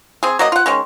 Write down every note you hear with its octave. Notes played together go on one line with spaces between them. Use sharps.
C4 G#4
F#3 A#3 D#5
F4 F#5
D#3 G#3 C#4